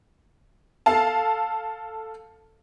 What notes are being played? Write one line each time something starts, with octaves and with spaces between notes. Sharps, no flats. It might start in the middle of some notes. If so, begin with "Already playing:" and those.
A4 F5 A5